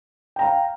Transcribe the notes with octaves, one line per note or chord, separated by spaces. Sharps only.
F5 G5 A#5